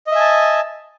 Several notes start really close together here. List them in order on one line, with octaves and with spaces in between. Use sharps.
D#5 E5 G#5 A5